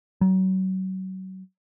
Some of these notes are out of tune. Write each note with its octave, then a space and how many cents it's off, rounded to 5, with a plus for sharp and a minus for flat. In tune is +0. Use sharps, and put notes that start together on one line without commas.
F#3 +30